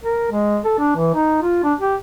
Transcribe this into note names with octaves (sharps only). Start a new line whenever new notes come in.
A#4
G#3
A4
D4
E3
D#4
F4
D4
G4